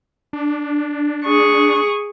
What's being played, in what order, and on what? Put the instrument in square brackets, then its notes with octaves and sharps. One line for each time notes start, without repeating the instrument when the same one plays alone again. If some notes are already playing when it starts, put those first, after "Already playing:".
[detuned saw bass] D4
[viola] G#4 C#6